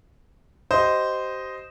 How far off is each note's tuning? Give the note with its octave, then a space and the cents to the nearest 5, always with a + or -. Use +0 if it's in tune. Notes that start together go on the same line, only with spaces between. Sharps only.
G4 -35 C5 -10 D#5 +0